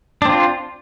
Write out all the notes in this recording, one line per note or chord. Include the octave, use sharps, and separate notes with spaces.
C4 D4 F4